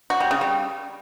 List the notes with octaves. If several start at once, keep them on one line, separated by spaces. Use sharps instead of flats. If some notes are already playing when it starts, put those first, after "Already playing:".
F#4
G3
C#3
G3